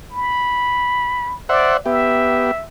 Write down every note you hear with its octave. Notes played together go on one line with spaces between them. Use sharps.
B5
C5 D5 E5 F#5
B3 G4 E5